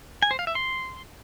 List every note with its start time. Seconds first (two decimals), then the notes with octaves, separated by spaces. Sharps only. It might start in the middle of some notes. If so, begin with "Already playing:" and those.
0.23 G#5
0.31 C5
0.39 F5
0.47 E5
0.55 C6